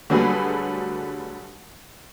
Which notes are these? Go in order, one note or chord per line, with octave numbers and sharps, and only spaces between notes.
D3 F#3 G3 A3 G#4 B4